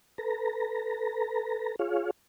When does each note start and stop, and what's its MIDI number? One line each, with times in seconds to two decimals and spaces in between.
0.18 1.76 69
0.18 1.76 71
0.18 1.76 82
1.79 2.11 65
1.79 2.11 68
1.79 2.11 73
1.79 2.11 77